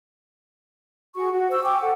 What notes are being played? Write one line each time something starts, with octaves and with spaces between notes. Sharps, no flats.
F#4 G#4 C#6
F#4
C5 C#6 E6
G5 G#5 C#6 D6
A4 F#5